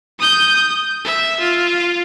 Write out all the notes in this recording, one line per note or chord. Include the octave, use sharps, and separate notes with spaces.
D#6 G6
E5
F4